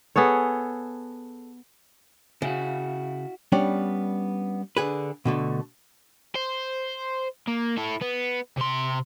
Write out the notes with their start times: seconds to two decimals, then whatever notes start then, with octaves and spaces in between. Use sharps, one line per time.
0.16 B3 G#4 A4 C#5
2.42 C#3 E4 F#4
3.52 G3 B3 C#4 D4
4.77 D3 G#4 B4
5.25 B2 D3 A3
6.35 C5
7.47 A#3
7.77 E4 A4
8.01 B3
8.57 C3 C6